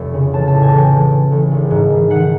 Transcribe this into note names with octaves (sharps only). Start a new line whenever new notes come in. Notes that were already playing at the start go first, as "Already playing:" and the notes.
Already playing: F1
C#3
A1 A5
A5
A2
G#5
A1 G5
E3
A1
A1
G#1
G#2
D#3
D#3 F#5